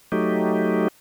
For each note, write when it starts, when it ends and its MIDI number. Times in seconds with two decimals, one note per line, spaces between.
0.12 0.88 54
0.12 0.88 57
0.12 0.88 63
0.12 0.88 67